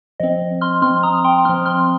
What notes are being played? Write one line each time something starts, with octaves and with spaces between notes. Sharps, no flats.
F3 C4 D#5
C6 F6
F3 C4 C6 F6
A#5 D#6
G5 C6
F3 C4 C6 F6
C6 F6